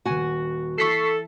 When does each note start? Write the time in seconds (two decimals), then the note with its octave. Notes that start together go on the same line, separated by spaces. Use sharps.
0.05 D#1 F#4 F#5 G#5
0.78 E3 A4 C#6 B6 C7